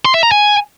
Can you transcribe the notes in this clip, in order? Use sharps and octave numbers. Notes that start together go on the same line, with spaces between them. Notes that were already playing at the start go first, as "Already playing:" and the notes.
C6
E5
A#5
G#5